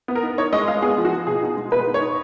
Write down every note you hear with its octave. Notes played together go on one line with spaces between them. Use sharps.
B3
A#4
D#4
D#4 C#5
G#3 D#5
G#3 F5
B3 G#4
F3
F#4
F3
B2 G#4
D#4
G#3
B2 B4
D#4
C#5
D#4